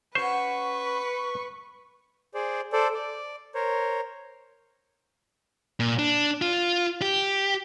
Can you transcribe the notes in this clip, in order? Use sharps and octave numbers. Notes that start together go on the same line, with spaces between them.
C#4 F#4 B4 C5 C#6
G#4 C5 D5
A4 C5 D5
D5
A#4 C5 C#5
A#2
D4
F4
G4